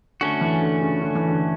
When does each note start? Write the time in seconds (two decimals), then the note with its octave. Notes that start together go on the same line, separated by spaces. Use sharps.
0.21 D3 A3 C#4 F#4
0.41 E3
0.62 D3
0.82 C#3
1.02 D3
1.15 E3
1.29 D3